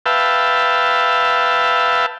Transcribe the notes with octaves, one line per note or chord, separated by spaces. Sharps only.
B4 E5 F5 G5 A5